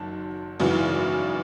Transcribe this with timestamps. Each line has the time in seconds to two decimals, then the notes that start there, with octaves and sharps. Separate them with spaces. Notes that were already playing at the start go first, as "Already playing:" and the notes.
Already playing: F#1 F#2 D#3 A5
0.60 G#1 F#2 C#3 E3